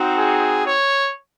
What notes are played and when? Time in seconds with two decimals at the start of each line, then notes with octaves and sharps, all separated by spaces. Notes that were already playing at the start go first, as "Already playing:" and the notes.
Already playing: C4 D#4 F#4
0.15 G#4
0.65 C#5